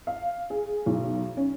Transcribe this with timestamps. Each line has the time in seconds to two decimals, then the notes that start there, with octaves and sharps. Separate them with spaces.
0.07 F5
0.50 G#4
0.86 B1
1.37 C#4